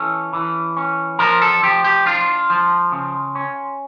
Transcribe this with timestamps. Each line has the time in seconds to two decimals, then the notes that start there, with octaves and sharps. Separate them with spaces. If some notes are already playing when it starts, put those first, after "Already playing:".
Already playing: E3 C#4 A4
0.33 E3
0.77 C#4
1.19 F3 A#4
1.42 A4
1.63 F3 G4
1.84 G4
2.06 D4 F4
2.50 F3
2.92 C#3
3.35 C#4